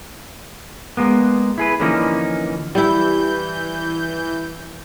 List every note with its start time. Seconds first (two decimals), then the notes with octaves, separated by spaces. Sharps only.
0.97 G#3 A#3 B3
1.58 E4 G#4 B4
1.80 D3 E3 F3 A#3 C#4 D#4
2.75 E3 G3 E4 G6